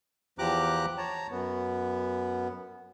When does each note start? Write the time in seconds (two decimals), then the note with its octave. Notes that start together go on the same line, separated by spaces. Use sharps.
0.39 E2 F3 G4 A#5 D6 F#6
0.98 C#5 A5 A#5
1.31 F#2 B3